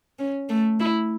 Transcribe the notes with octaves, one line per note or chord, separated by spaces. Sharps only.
C#4
A3
E4